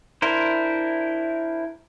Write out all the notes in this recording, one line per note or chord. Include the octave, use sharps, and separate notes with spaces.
D4 E4 A#4 C5